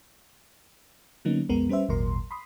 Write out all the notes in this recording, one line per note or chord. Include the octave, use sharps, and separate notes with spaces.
D3 F#3 A#3 B3 C#4 D#4
B1 F2 G#3 B3 A#4
G3 C#4 B4 C5 E5
G#1 D#2 A#2 F#3 A#4 C6
B5 C6 D#6